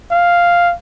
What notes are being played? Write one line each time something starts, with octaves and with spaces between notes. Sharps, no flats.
F5